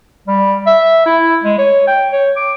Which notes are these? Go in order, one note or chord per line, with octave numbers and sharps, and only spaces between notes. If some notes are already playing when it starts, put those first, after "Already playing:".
G3
E5
E4
G#3
C#5
G5
C#5
D6